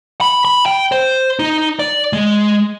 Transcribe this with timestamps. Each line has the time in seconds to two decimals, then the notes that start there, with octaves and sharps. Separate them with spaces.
0.21 B5
0.45 B5
0.66 G5
0.92 C5
1.39 D#4
1.79 D5
2.13 G#3